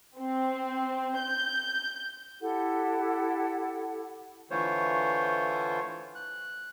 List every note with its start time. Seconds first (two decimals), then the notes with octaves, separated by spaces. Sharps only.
0.18 C4
1.17 G6
2.41 E4 G4 A4 F#5
4.51 D3 E3 A3 F4 C5 C#5
6.15 F#6